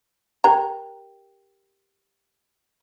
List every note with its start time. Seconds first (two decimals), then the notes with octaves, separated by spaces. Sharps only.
0.44 G4 A#4 G5 A#5